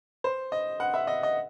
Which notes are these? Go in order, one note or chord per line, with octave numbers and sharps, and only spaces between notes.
C5
D#5
F#5
E5
D#5
D#5